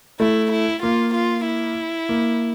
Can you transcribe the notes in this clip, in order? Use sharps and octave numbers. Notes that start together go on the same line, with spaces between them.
A3 E4
E4
A#3 F4
F4
E4
A#3